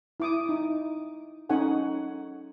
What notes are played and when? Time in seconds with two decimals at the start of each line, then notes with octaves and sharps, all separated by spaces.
0.20 E4 D6 D#6
0.49 D#4
1.49 C#4 D#4 A4 C#5 F#5 G#5